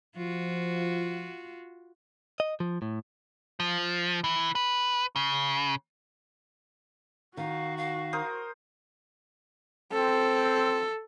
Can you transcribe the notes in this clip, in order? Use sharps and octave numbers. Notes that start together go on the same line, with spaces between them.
F3 F4 F#4
D#5
F3
A2
F3
E3
B4
C#3
D#3 F#4 F5
F5
A#4 C5 D#6
C4 A4